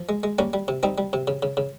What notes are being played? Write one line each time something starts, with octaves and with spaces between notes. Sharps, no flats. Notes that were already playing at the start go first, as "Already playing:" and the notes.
Already playing: F3
G#3
G#3
G3 A#3 C#4
G3
C3
G3 C4 D#4
G3
C3
C#3
C#3
C#3